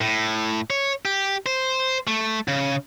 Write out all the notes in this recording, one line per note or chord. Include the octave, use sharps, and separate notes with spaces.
A2
C#5
G4
C5
A3
C#3